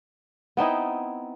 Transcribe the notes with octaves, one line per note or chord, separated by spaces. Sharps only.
B3 C4 D#4 E4